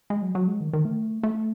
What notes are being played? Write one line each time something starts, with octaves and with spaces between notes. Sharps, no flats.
G#3
F#3
F#3
G#3
D#3
D#3
A3
A3